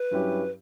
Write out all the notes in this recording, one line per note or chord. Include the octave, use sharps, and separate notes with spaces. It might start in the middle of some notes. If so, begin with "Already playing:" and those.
Already playing: B4
G2 F#3 C#4 E4 G4